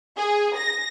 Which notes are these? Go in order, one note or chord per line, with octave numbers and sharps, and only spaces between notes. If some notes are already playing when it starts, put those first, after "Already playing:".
G#4
A#6